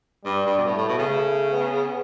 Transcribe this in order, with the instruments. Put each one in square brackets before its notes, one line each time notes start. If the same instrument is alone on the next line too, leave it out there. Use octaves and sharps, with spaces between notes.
[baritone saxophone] G2 [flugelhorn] G3
[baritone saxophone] G2
B2
[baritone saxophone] A2 [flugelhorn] A3
[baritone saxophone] A2
B2
C#3
[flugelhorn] A3
B3